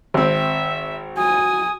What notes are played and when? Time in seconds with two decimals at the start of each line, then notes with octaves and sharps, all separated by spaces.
0.14 G#1 C4 E5
1.17 F#4 G#5 D#6